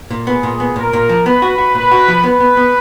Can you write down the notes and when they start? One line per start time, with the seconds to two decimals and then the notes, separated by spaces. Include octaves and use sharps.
0.10 A#2
0.27 B3 G#4
0.43 A#2
0.60 B3
0.76 A#2 A#4
0.93 A#2
1.09 F3
1.26 B3 B4
1.42 F#4
1.58 F#4
1.74 A#2 B4
1.91 F#4
2.08 F3
2.24 B3 B4
2.40 B3
2.57 B3